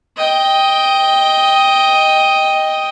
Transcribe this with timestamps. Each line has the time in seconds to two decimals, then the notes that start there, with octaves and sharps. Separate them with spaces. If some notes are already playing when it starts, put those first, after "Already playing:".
0.17 D#5 G5